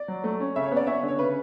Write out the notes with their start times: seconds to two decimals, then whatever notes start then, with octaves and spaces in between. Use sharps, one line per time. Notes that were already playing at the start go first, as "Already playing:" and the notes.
Already playing: D5
0.08 F#3
0.24 A3
0.40 C#4
0.56 C#3 E5
0.66 C#5
0.71 B3
0.76 D5
0.87 C#4 E5
1.03 D3
1.08 C#5
1.19 C#3 B4